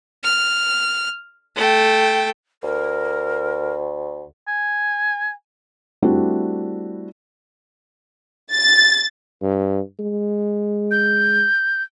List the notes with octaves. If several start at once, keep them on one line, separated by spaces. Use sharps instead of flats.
F6
A3 G5
D2 A#4
G#5
G3 A3 C4 D4 E4 F#4
A6
G2
G#3
G6